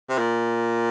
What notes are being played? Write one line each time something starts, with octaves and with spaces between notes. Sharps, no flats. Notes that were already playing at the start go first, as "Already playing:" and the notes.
C3
A#2